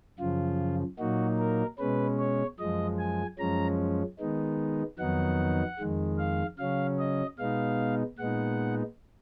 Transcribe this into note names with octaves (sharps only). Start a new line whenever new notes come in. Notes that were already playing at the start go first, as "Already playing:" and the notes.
F#2 C#3 F3 F4
A#2 F#3 A#3 D#4 F#4
A#4
B2 G#3 C#4 B4
C#5
F#2 F3 G#3 D#5
G#5
F#2 F3 G#3 C#4 A#5
D#3 G#3 B3 D#4
F2 D#3 F#3 B3 D#4 F#5
F2 D#3 G#3
F5
C#3 F#3 C#4 F5
D#5
B2 G#3 B3 D#4 F5
A#2 G#3 B3 D#4 F#5